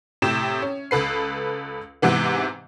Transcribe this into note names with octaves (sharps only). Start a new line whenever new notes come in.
A2 C3 G5 E7
C#4
C#2 A4 B4 C7
G#2 C3 E3 B3